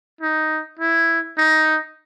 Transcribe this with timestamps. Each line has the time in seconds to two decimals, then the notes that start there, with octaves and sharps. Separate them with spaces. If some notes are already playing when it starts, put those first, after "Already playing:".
0.21 D#4
0.79 E4
1.38 D#4